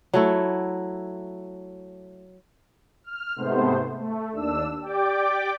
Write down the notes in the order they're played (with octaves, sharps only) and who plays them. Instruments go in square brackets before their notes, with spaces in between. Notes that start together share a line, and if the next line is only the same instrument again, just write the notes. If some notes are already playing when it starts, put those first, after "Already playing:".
[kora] F#3 A3 E4
[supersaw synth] F6
G#2 C3 A3 B3 C5
A3
D#2 D4 E6
G4 D5 G5 D6